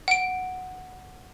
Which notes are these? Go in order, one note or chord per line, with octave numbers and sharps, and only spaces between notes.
F#5 D7